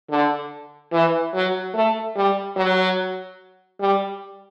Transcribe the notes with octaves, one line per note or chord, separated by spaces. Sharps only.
D3
E3
F#3
A3
G3
F#3
G3